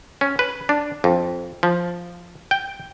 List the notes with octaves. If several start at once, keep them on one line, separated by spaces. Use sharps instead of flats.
C#4
B4
D4
F2
F3
G5